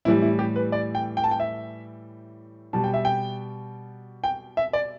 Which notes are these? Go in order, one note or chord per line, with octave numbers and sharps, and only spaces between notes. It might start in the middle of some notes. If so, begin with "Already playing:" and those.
A2 E3 G3 E4
E4
G4
B4
D5
G5
G5
A5
G5
E5
B2 G3 A5
G5
E5
G5
G5
E5
D5